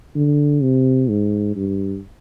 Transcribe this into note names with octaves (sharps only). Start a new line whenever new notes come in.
D3
C3
G#2
G2